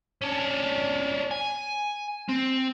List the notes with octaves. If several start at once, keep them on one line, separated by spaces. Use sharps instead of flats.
C#4 D4
G#5
C4